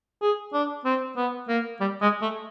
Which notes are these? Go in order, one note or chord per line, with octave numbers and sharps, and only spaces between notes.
G#4
D4
C4
B3
A#3
G3
G#3
A3